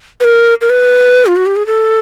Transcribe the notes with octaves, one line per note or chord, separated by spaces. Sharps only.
B4
A#4
A#4
B4
F4
F#4
G4
G#4
A4